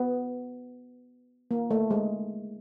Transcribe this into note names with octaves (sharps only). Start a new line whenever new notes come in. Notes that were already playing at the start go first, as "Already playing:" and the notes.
Already playing: B3
A#3
A3
G#3